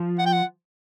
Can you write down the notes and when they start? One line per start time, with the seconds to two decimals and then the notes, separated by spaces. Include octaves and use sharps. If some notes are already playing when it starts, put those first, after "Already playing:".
Already playing: F3
0.19 F#5
0.26 G5
0.33 F#5